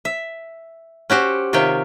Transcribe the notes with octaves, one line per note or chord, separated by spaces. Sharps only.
E5
C#4 F#4 G4 C5
C3 D#3 F4 C#5 E5 G5